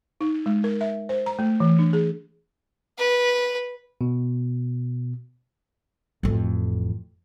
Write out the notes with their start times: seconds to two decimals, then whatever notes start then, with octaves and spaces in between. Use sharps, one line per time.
0.21 D#4
0.46 G#3
0.64 A#4
0.81 E5
1.09 C5
1.26 A#5
1.39 A3
1.60 E3
1.79 D4
1.93 G#4
2.98 B4
4.01 B2
6.23 A1 F2